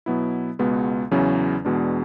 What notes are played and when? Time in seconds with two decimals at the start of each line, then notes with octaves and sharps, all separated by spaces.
0.06 B2 F#3 B3 E4
0.59 C#2 B2 G#3 B3
1.11 E2 C#3 F#3 C#4 E4
1.65 E2 B2 G#3 D4